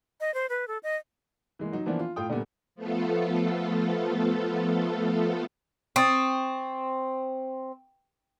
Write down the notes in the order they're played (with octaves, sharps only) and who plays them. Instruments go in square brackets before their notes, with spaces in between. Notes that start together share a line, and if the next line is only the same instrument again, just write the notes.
[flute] D#5
C5
B4
A4
D#5
[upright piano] E3 G#3 A#3
F#3 D#4
E3 F3 A#3 B3 D4
F4
A2 F4 G5 D#6
A#2 D3 G3 A3 B3
[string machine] F3 A3 B3 F4 A4
[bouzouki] C4 [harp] C#6 D#6 A6